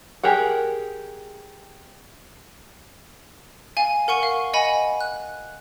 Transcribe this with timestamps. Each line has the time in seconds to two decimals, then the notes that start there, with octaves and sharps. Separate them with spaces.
0.23 G4 G#4 A#4 F#5
3.77 F5 G#5
4.08 A#4 F#5 C#6 D#7
4.23 F5
4.54 D#5 F#5 G#5 B5
5.01 F#6